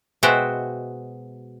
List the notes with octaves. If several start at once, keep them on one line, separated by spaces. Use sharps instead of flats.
B2 G#3 F#4 C5 E5 G5